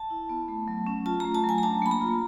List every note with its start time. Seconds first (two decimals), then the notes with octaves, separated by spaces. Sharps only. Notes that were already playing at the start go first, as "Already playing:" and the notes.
Already playing: A5
0.10 E4
0.29 B3
0.48 A3
0.68 F#3
0.87 C#4
1.06 F4 A5
1.20 A3 A#5
1.35 A5
1.44 F#3
1.49 G#5
1.58 A#5
1.63 D4 A5
1.82 A#3 B5
1.91 A#5
2.01 F4